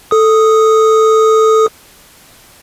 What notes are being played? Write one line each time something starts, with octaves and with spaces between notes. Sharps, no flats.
A4 D#6